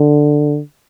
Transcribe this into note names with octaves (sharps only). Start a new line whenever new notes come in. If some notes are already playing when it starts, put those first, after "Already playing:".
Already playing: D3